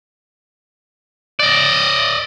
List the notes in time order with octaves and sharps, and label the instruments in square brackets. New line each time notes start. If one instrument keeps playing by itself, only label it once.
[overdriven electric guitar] D5 D#5